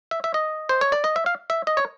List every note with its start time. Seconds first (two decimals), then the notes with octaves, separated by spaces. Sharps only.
0.11 E5
0.24 E5
0.34 D#5
0.69 C5
0.81 C#5
0.92 D5
1.04 D#5
1.16 E5
1.26 F5
1.50 E5
1.67 D#5
1.77 C#5